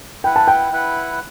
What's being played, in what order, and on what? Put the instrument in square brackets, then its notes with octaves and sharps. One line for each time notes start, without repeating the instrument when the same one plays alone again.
[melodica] E4 B4 F#5 [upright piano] G5
[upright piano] A5
G5
[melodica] E4 B4 F#5